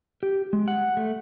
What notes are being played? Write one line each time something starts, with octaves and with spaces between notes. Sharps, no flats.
G4
G#3
F#5
A3